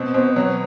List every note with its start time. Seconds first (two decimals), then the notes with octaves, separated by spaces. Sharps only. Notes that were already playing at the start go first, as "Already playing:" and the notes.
Already playing: B2 C4
0.14 B2 C5
0.36 F#3 C#5